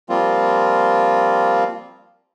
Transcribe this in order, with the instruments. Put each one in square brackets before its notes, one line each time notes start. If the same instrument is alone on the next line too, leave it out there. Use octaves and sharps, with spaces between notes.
[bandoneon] F3 G3 A#3 C4 F4